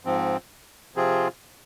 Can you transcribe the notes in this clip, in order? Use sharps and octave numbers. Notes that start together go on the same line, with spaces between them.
G#2 F3 C4
C3 F3 C4 F4 G#4